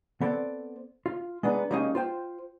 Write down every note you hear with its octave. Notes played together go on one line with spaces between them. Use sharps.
B3 C4 A4 D5
F4
G#3 B3 D4 D#4
G3 G#3 A#3 C#4 D#4 G4
F4 C5 G5